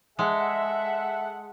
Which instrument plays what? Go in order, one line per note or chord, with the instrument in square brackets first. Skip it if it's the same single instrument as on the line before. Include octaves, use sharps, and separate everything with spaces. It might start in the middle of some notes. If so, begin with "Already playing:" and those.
[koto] G#3 [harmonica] A4 [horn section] E5 [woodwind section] F#5